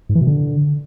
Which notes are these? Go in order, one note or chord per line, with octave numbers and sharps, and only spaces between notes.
G#2
E3
B2
D3